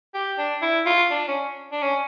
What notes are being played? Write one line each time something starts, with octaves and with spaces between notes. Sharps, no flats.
G4
D4
E4
F4
D4
C#4
D4
C#4